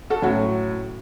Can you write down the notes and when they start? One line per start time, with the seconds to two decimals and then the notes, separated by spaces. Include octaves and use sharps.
0.10 F#4 A4
0.22 A2 F#3 C#4 F#4